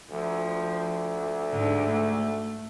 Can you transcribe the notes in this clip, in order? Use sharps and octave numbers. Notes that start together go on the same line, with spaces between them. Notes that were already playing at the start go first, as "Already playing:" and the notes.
D2 F3
G#2 D3
A3